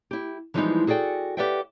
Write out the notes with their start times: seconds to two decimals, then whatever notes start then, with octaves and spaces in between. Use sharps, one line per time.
0.11 E4 G4
0.54 E3 F3 G3 G#3 B3 D#4
0.87 F#4 G#4 A4 D5 G5 G#5
1.37 G4 B4 D5 E5 F#5 G5